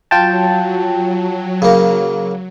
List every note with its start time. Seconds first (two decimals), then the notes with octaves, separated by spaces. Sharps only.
0.11 F#3 F4 G5 A5
1.62 C#3 A#3